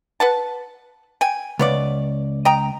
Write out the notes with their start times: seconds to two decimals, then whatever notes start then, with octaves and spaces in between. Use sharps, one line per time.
0.20 B4 F#5 A5
1.21 G5 G#5
1.59 C#2 B3 C#5 D5
2.45 D#5 G5 A#5